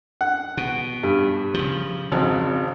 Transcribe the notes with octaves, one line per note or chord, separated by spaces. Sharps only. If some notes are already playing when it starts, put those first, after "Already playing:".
F#5
B2
G2
C#3 F3
G#1 F2 C#3